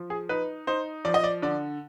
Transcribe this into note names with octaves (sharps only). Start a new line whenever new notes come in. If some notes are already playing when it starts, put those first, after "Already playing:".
Already playing: F3
G#4
D#4 B4
D#4 C5
F3 D5
D#5
D5
D3 D5